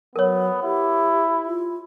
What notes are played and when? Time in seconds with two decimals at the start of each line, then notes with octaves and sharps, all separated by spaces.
0.16 F#3 B3 A#4 C#5
0.64 E4 G4
1.46 F4